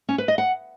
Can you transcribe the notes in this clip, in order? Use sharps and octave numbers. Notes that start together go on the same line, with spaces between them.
C#4
B4
D#5
F#5